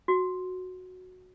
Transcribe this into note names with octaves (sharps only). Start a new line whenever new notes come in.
F#4